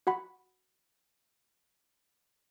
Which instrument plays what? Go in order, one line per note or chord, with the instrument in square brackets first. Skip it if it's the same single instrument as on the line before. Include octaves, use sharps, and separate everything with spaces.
[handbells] F#4 F#5 B5